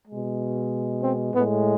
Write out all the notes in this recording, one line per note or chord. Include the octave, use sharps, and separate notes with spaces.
B2 G#3
C4
A2 G#3 B3